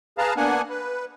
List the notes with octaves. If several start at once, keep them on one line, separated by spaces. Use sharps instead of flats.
G#4 B4 F5 A5 A#5
A#3 B3 D4 F#5 G#5
B4